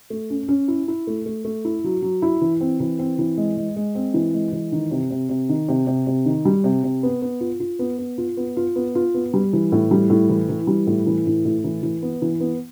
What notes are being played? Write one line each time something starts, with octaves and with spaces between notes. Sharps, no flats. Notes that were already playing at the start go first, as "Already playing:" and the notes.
A3
C#4
C#4
E4
E4
A3
A3
A3
E4
F#3
F#3
E4
E3
C4
E3
C4
E3
G#3
G#3
G#3
C4
E3
G#3
E3
D#3
C3
C3
C3
D#3
C3
C3
C3
D#3
G3
C3
C3
B3
B3
F4
F4
B3
B3
F4
B3
F4
B3
F4
B3
G3
E3
A2
G3
A2
E3
E3
G3
A2
E3
A2
A2
E3
E3
B3
E3
B3